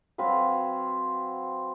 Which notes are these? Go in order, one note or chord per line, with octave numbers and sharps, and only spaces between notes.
F#3 C4 B4 F5